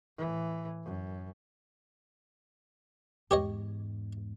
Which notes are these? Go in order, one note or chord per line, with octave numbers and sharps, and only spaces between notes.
A2 E3
F#2
E2 G#2 G4 C#5 D#5